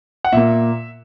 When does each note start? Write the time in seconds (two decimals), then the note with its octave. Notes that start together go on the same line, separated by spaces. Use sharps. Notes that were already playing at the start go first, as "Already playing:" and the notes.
0.25 F#5
0.32 A#2 A#3 E5